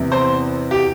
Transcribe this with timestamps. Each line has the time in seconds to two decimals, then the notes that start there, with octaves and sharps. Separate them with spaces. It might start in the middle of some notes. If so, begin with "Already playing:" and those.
Already playing: E2 C3 E3
0.12 C5
0.71 G4